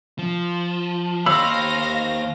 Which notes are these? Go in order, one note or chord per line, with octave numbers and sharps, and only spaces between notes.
F3
D#2 C5 C#5 F5 B5 E6 A#6